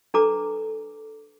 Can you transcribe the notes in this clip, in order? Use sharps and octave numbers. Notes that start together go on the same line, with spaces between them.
D4 A4 B4 A#5 D6